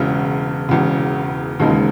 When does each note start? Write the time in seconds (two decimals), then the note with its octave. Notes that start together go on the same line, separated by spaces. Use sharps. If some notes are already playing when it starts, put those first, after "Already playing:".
Already playing: E1 E2 C#3
0.69 E1 E2 C#3
1.60 E1 D#2 C#3 G#3 D#4